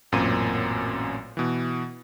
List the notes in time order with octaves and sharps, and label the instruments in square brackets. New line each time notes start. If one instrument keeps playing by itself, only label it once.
[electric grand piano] A1 F#2 A#2 A#3 C4 D#7
B2 E3